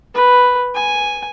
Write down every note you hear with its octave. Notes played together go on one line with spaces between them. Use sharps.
B4
G#5